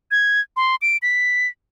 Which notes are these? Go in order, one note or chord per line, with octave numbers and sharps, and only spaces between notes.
G#6
C6
D7
B6